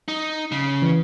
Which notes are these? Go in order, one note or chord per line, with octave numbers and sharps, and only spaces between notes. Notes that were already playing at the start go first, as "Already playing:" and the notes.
D#4
C#3
E3